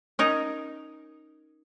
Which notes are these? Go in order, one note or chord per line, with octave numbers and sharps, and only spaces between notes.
C#4 D#4 A#4